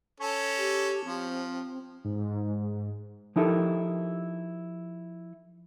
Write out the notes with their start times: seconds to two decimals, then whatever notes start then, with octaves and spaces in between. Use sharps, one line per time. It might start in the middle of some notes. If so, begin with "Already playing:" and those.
0.20 C#4 A4 C#5
0.58 G4
1.05 F3 C4
2.05 G#2
3.36 F3 D#4 E4 G4 A4 A#4